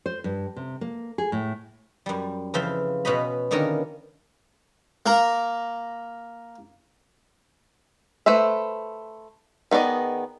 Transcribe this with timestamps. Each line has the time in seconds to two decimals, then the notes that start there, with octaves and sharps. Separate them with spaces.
0.06 C5
0.24 G2
0.56 C3
0.81 A#3
1.18 G#4
1.32 A2
2.06 F#2 G3
2.54 F2 C#3 E3 F4 C5 E5
3.05 B2 C#4 F#4 C5 D#5 B5
3.51 B2 D3 D#3 A#3 C#4 A#4
5.06 A#3 A#4 A#5
8.26 A3 B4 C5 E5
9.71 D#3 B3 G#4 D5 D#5